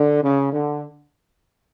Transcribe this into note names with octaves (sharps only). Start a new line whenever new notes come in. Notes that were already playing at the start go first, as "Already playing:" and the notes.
Already playing: D3
C#3
D3